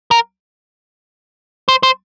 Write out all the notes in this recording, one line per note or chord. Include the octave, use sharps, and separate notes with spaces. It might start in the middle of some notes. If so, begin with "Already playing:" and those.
A#4
C5
C5